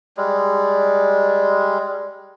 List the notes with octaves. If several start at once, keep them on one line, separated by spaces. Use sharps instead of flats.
G3 G#3